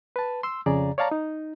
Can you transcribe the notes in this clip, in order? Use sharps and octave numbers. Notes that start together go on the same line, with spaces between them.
B4 A5
C6 E6
F2 C#3 G#4 D5 A#5
C#5 D5 F5 A5 A#5
D#4